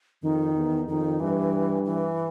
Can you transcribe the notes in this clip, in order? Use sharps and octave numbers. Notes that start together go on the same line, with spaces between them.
F2 D#3
E2
F2 D#3
G2 E3
E3